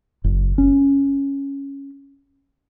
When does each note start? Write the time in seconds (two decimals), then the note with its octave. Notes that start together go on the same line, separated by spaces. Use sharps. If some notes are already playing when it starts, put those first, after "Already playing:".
0.24 F#1
0.58 C#4